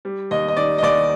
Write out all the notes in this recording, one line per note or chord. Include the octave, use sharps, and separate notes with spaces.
G3
D#2 D#5
D#5
D#3 D5
D#5
D#2 D5